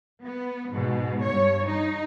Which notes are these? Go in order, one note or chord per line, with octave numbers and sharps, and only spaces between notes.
B3
G#2 B2
G2 C#5
D#4